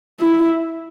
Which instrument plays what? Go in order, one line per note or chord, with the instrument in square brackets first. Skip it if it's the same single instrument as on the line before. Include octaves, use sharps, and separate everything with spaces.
[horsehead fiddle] E4